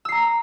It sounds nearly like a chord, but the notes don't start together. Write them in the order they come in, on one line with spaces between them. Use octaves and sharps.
E6 C7 A#5